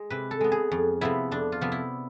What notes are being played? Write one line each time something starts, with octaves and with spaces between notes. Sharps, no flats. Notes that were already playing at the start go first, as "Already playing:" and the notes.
Already playing: G#3
C3 B4
A4
G#3 B3
G#4
F2
C3 F3 B3 E4
F2 D4
F4
C3 F3 B3
E4